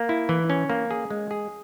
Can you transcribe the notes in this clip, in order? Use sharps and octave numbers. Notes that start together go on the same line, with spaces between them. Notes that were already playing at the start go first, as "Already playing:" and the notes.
Already playing: A#3
E4
E3
C#4
A#3
G#4
G#3
G#4